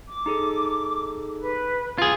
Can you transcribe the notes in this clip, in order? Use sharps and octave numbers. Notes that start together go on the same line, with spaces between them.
D6
D#4 G#4 A4
B4
F4 G#4